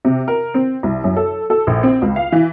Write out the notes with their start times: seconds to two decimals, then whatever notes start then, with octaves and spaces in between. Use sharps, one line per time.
0.05 C3
0.28 A#4
0.54 C4
0.83 C2
1.04 F#2
1.16 A4
1.50 A4
1.67 A#1
1.83 C4
2.02 C#2
2.16 F5
2.32 E3